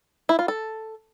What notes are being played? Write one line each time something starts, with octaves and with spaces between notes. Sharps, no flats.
E4
F4
A4